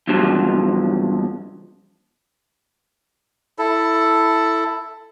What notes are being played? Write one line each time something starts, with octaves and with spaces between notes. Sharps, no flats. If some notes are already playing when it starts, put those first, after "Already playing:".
E2 G2 C#3 F3 F#3
E4 A4